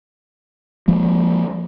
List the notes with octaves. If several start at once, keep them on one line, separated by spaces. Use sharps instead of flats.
F3 G#3 A#3